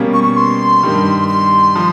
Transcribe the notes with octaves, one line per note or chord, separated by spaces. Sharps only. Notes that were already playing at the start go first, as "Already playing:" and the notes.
Already playing: B2 G3 A#3 C#4
C#6
C#6
C6
G2 D#3 G3
C6
F3